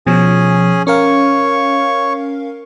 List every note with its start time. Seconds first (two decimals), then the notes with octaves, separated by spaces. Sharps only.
0.07 B2 F3 C#4 G#4 G#5
0.87 C#4 A#4 C#5 F5 C#6